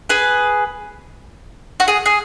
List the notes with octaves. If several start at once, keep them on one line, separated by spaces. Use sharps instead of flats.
G#4 B4
F#4
G#4
G#4